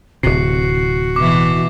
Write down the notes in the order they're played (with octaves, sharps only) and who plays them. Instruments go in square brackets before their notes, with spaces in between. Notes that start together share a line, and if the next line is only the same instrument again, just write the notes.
[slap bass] D1 C3 [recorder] F#4 [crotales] C7
[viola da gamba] B2 E3 E4 [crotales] D6